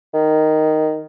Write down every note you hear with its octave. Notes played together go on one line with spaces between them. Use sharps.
D#3